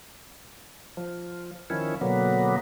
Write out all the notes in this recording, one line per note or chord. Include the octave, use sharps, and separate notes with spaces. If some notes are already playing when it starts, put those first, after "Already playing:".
F3
D#3 F3 C#4 E4
B2 D3 F#3 A#3 B3